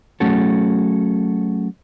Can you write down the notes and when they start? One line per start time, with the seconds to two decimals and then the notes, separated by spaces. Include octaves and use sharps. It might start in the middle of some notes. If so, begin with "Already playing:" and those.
0.20 F#3 A3 C#4 F#4 G#4 A4